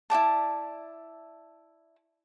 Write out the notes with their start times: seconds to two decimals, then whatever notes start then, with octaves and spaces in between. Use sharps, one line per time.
0.10 E4 F#4 D5 A5